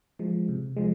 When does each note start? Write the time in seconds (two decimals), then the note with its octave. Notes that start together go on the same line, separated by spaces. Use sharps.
0.19 F3 G#3
0.49 C3
0.77 F3 G#3